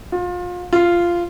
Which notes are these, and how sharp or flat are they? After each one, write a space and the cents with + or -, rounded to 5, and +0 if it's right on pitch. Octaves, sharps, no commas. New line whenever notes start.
F4 +30
F4 -10